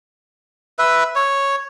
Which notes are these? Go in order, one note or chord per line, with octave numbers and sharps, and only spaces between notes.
B4 E5
C#5